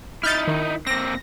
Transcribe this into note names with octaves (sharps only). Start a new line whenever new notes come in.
D#4 E4 F6 G6 A6
D#3
A#3 C4 A#6